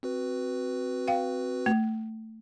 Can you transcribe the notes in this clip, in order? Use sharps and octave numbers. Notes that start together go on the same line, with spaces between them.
C4 F#4 B4
F5 G5
A3